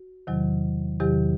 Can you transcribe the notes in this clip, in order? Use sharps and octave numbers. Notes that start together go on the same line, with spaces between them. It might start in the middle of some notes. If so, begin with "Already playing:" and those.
Already playing: F#4
E2 C3 D#3 F#3
E2 C3 D#3 F#3 G4